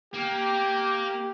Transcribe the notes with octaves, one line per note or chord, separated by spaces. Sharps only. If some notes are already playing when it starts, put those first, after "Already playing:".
A#3 G4